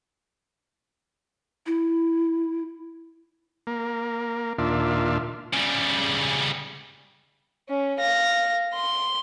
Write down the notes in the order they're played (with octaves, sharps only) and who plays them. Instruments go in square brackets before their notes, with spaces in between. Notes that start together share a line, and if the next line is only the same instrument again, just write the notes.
[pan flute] E4
[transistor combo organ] A#3
D#2 A#2 D4 F4 E5
[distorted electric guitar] C#3 G3
[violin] C#4
F5 A#6
C6